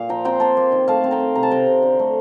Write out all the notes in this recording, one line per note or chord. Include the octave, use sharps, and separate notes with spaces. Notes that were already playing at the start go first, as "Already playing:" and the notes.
Already playing: A#2 F5
F3 G5 A#5
C4 G5 A#5
A#3 A5 C6
A#3
D#3
A3 F5 A5
C4
G5 A#5
C4
C3 A#5
A5
C3 G5 A#5
C3
D3
A3